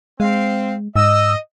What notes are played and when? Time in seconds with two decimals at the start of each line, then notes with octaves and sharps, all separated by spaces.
0.20 G#3 C4 F5
0.96 G#2 D#5 E6